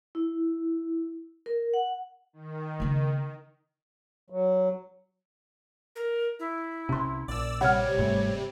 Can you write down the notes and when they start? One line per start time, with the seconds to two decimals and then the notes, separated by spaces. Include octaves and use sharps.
0.15 E4
1.46 A#4
1.74 F#5
2.33 D#3
2.80 C#3 B3
4.30 F#3
5.96 A#4
6.39 E4
6.89 C2 C3 C#4 C6
7.28 A#1 D5 E6
7.61 C3 G3 C#5 F#5 F6
7.98 G1 G#2 A3